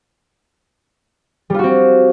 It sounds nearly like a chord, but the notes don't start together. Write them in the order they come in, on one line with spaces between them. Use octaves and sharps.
G3 F4 F#4 C4